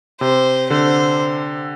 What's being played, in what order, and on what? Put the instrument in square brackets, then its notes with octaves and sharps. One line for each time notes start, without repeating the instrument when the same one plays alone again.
[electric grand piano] C3 [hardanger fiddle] C5
[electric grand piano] D3 [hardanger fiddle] C5